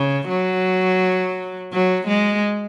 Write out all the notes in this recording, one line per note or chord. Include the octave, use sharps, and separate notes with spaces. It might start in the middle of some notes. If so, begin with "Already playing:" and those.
Already playing: C#3
F#3
F#3
G#3